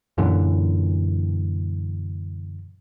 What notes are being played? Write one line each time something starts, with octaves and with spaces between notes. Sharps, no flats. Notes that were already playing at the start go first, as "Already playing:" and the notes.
F#2 A#2 D3 E3